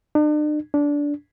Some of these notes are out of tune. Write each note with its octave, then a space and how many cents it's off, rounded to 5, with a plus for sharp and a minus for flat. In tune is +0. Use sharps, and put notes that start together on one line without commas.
D4 +45
D4 -15